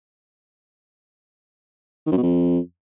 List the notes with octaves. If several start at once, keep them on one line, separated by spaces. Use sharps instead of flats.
D#3
F#2
B2
F2